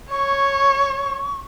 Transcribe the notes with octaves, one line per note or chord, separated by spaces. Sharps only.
C#5 C#6